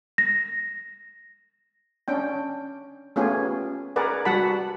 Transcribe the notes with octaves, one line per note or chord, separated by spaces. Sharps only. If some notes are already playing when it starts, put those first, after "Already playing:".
A#6
C#4 D4 G5
A3 B3 C#4 F4 G4 G#4
G#4 A#4 B4 D5 F#5
G3 F#4 F#5 A5 B5